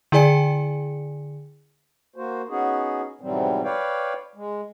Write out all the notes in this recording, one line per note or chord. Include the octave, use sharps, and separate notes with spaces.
D3 E4 G#4 D5 G#5 C#7
A#3 F#4 C5
B3 C#4 D#4 F#4 G#4
G#2 B2 E3 F#3 G3 C4
B4 C#5 D5 F5 G5
G#3